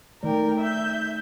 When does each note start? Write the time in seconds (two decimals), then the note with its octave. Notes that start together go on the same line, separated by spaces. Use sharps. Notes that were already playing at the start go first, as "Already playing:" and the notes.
0.23 D#3 A3 A#4 D5 G5
0.62 E5 G6